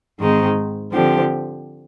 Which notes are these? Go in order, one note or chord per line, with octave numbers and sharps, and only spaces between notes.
G#2 D#3 G#3 C4 D#4
D3 F3 C4 G4